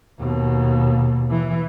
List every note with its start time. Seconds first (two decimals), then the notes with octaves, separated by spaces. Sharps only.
0.19 D#2 B2
1.31 E3